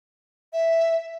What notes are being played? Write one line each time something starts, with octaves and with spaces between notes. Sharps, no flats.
E5